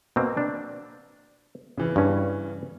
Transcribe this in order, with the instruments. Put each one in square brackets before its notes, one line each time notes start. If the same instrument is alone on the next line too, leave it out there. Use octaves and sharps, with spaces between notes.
[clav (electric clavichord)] B2 A#3 C4
D4
[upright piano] C#3 E3
[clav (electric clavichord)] G2 C#4